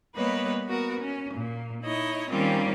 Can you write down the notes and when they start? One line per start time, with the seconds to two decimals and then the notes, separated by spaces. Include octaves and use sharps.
0.15 G3 A#3 B3 B4 C#5 D#5
0.68 B3 F#4 A#4
1.00 C#4
1.35 A#2 A#3
1.83 D#4 E4 C#5 D#5
2.30 D#3 G3 A#3 C4 C#4 F4